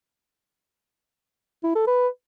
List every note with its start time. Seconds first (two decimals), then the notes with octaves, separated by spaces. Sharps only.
1.63 E4
1.75 A4
1.87 B4